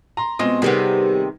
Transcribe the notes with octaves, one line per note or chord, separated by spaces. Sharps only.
A#5 C6
B2 G#3 C4 F4 D#5
C3 D#3 G3 B3 G#4